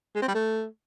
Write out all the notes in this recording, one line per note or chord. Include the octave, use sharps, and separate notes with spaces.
G#3
C4
G3
A3